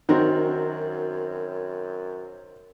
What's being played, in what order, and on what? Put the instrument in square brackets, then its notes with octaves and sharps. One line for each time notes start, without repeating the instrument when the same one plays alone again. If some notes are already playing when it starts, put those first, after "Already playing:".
[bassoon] F#2 [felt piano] D#3 C4 [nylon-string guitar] F#4 A#4